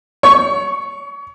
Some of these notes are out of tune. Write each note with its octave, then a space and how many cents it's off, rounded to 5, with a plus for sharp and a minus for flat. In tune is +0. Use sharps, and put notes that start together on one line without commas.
C#5 +30 C#6 +0